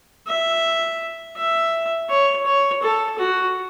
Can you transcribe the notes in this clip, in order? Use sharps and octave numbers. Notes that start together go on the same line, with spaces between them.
E5
E5
C#5
C#5
A4
F#4